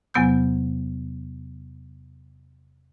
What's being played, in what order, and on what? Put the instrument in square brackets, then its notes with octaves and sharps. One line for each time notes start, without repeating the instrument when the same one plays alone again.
[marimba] E2 C3 F#3 B3 E6 G6